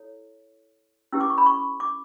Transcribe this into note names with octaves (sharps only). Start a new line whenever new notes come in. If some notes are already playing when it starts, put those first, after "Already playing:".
Already playing: E4 A4 C#5
C#4 E4 G4 B4 E6
D6
C#6
B5
C#6
D6